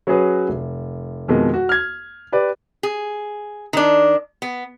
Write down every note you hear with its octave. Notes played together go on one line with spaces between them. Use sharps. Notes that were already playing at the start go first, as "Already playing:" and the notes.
F#3 C#4 F#4 G#4 B4
F1
F2 B2 D#3 G#3
F#4
F6 G#6
G4 B4 D5
G#4
D#3 D4
B3